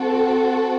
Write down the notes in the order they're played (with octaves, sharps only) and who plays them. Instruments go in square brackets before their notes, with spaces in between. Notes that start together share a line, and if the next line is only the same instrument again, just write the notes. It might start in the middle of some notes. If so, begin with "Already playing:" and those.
Already playing: [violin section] C4 F#4 A4